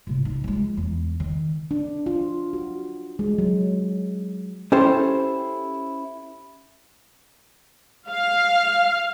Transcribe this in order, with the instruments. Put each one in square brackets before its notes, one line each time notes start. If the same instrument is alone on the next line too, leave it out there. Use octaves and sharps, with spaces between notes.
[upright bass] A2 C3
D#4
F3 G#3
E2
D#3
[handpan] D4
F4
F#4
G#3
F#3
[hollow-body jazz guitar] C#4 E4 G4 A4 C5
[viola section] F5